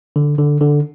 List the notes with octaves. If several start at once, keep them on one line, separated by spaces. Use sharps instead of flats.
D3
D3
D3